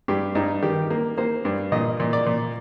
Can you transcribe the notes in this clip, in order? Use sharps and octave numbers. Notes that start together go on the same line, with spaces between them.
G2 G4
G2 D#4
D#3 G4
A#3
A#3 C5
G2
A#2 D#5
A#2
D5
A#2